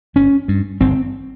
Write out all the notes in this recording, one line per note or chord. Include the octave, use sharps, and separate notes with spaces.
G1 C#4
G2
G1 C4